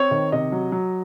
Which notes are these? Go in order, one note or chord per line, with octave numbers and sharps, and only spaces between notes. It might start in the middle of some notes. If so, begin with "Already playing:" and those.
Already playing: C4 C#5
D#3
C3 D#5
F#3
F#3